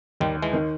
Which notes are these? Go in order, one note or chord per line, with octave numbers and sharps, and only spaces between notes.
D#2 D#3 G3
E3 G#3
D#3